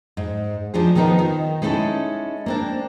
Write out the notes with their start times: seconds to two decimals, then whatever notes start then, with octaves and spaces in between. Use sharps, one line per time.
0.17 G#2
0.74 F3 D4 D#4 G#4
0.95 D#3 F3 B3 D#4 A#4
1.19 D#3
1.62 G#3 C#4 D#4 E4 A4
2.46 A#3 C4 D4